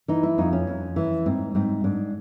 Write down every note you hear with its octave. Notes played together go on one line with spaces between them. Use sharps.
E3 D#4
E4
F2 D#4
C#4
F2
E3
G#2 C4
G#2 C4
G#2 D4